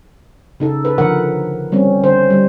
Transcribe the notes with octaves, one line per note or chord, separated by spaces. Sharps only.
C#3 D#4 A4
A4 B4
D3 F3 A#4 F#5
G3 C4 C#4
D3 C5
G3